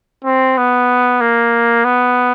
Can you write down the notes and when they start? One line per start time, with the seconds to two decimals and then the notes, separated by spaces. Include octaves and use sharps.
0.25 C4
0.58 B3
1.21 A#3
1.84 B3